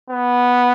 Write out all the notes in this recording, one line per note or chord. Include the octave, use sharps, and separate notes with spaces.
B3